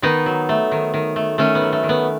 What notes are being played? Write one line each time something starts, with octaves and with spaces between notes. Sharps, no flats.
D#3 B3 D#4
F#3
A3
D#3
D#3
A3
D#3 A3 C#4
B3
F#3
A3
D#3
B3